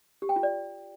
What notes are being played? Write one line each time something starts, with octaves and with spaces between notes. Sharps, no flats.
G4
G5
F4
D5